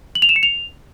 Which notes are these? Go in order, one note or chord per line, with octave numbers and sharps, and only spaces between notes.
F#7
F7
E7
C#7
F7